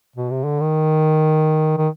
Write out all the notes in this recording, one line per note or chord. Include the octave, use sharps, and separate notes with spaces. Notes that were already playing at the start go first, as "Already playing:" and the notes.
B2
C3
D3
D#3
D#3